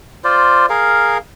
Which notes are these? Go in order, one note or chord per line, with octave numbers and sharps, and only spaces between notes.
F4 C5 D5
G#4 A#4 F5